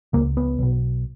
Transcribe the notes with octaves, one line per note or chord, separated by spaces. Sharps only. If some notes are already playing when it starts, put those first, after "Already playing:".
C#2 C#3 A#3
B3
B1 B2